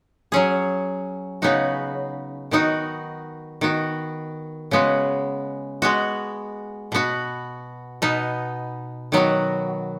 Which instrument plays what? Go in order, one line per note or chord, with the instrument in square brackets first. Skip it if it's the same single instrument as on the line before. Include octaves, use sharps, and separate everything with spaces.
[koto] F#3 C#4 G#4
C#3 B3 D#4 F#4
D#3 B3 D#4 F#4
D#3 B3 F#4
C#3 G#3 B3 F#4
G#3 B3 F#4
B2 B3 F#4
B2 B3 D#4
D#3 F#3 B3 F#4